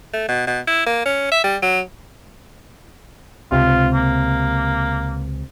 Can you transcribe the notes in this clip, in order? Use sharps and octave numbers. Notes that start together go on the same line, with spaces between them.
A3
B2
B2
E4
A#3
C#4
E5
G3
F#3
C#2 C3 F4
A#3